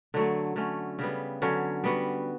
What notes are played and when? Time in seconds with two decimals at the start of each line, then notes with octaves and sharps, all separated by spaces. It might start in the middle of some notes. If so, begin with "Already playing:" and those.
0.14 D3 F#3 A3
0.56 D3 A3 C#4
0.99 C#3 G3 B3
1.42 D3 F#3 C#4
1.84 G3 B3 F#4